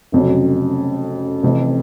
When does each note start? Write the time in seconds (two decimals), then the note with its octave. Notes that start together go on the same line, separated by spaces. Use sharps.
0.12 F1 F2 C#3 F#3
1.43 F1 F2 C3 E3